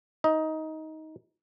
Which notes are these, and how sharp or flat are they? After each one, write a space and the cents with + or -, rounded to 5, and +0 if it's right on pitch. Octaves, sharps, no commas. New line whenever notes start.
D#4 +15 D#5 +15